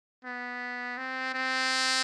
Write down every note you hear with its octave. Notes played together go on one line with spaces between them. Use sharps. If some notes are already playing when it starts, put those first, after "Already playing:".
B3
C4
C4